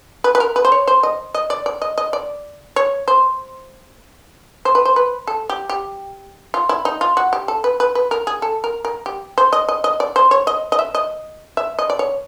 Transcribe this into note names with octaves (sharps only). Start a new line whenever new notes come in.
B4
B4
A#4
B4
C5
C#5
C5
D#5
D#5
D5
D5
D#5
D#5
D5
C#5
C5
C5
B4
C5
B4
A4
G4
G4
F4
E4
D#4
F4
F#4
G4
A4
B4
B4
B4
A#4
G#4
A4
A#4
A#4
G4
C5
D#5
D#5
D#5
D5
C5
C#5
D#5
D#5
E5
D#5
E5
D#5
D5
C#5